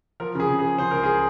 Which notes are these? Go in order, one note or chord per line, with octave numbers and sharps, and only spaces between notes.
F3 A#4
C#3 G#4
C#3
G#4
F3
C#3 C5
C#2 A#4
G#4